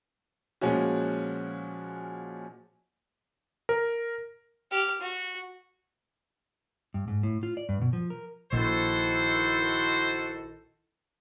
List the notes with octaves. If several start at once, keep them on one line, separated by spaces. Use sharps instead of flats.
A#2 F3 G#3 C#4 F#4
A#4
G4 F6
F#4
G2
G#2
A2
F4
D5
G2
B2
F3
A#4
A#1 D#3 E4 F#4 A4 C5